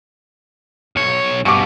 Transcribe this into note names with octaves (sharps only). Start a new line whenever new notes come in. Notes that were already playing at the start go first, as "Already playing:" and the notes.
B1 C#5
G2 B2 C#6 D6